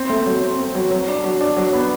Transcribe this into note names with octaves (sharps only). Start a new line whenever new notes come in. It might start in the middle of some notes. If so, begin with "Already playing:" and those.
Already playing: C4
A3
F#3
C4
C4
F#3
F#3
D4
F#3
D4
F#3
B3